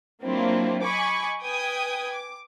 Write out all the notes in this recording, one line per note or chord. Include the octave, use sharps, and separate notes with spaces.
F#3 A#3 C4 D4 E4 F4
D#5 G#5 B5 C#6 D6
B4 G5 G#5 D#6 G#6
D6